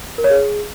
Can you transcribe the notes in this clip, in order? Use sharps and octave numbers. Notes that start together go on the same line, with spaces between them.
A#4
C#5
G#4